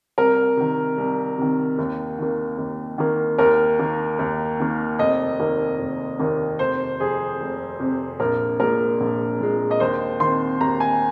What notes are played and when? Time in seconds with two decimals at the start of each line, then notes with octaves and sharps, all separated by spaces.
0.18 C2 A#4
0.57 C3 D#3
0.98 C2
1.38 C3 D#3
1.79 D#2
2.18 D#3 A#3
2.58 D#2
2.98 D#3 A#3
3.38 D#2 A#4
3.79 D#3 A#3
4.19 D#2
4.60 D#3 A#3
4.99 F1 D#5
5.40 D#2 D#3 A#3
5.79 F1
6.19 D#2 D#3 A#3
6.59 F1 C5
7.00 F2 C3 G#4
7.40 F1
7.80 F2 C3
8.20 A#1 A#4
8.60 A#2 G#3 A#4
9.00 A#1
9.41 A#2 G#3
9.71 D#5
9.80 D#2 C5
10.20 D#3 C4 C6
10.61 D#2 A#5
10.80 G#5